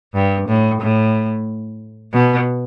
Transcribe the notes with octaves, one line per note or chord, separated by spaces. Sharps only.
G2
A2
A2
B2